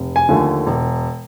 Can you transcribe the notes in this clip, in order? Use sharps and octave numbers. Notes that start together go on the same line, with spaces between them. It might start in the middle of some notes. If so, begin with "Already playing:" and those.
Already playing: F1
G#5
D#2 D3 F3 A3
E1